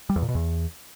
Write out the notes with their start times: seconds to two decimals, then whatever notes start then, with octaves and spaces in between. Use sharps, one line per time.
0.10 G3
0.16 E2
0.22 A#2
0.29 B2
0.35 E2